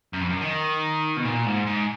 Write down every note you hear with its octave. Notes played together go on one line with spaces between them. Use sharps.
F#2
F2
F#2
D#3
B2
A#2
G#2
G#2